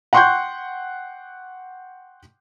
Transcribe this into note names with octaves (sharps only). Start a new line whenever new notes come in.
F#5 G5 C6 C#6 F#6 G6